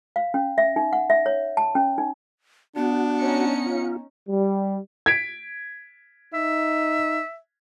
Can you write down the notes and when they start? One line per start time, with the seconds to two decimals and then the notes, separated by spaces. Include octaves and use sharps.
0.16 F5
0.34 C#4
0.58 E5
0.76 D#4
0.93 F#5
1.10 E5
1.26 C#5
1.57 A5
1.75 C#4
1.98 D#4
2.76 B3 D4 F#4
3.20 C#4 D#4 C#7
3.66 F4
4.29 G3
5.06 G#6 B6 D7
6.34 D#4 E5